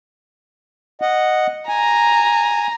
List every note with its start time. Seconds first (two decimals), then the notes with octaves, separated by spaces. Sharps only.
1.02 D#5 F#5
1.69 G#5 A#5